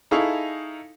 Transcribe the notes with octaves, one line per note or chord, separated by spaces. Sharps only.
D#4 E4 G#4 A4 F5 C#6